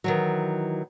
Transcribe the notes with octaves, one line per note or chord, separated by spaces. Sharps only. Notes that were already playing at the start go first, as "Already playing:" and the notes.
D#3 E3 F#3